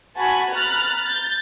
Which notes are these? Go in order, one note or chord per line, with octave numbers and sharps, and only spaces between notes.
F#4 G#5 A5 B5 G#6
A#5 B5 F6 F#6 A6
G6 A6